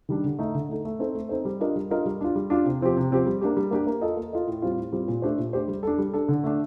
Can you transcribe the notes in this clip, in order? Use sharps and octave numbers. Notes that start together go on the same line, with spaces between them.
D#3 G3 D4
D3
A3 D#4 A4
D3
A3 D#4 A4
A3
C4 D#4 A4 C5
A3
C4 D#4 A4 C5
G3
D4 F4 A#4 D#5
G3
D4 F4 A#4 D#5
G3
D4 F4
G3
D4 F4
C3
F3 C4 G4
C3
F3 C4 G4
G3
A#3 D4 G4
G3
A#3 D4 G4
A#3
F4 A4 D#5
A#3
F4 A4 D#5
A2
G3 C4 F4
A2
G3 C4 F4
A#2
A3 D4 G4 C5
A#2
A3 D4 G4 C5
G3
D4 A4
G3
D4 A4
D3
A3 D4